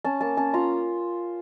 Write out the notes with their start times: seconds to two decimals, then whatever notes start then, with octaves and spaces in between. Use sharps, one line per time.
0.04 C#4 A5
0.21 A#3 A5
0.37 C#4 A5
0.54 F4 A#5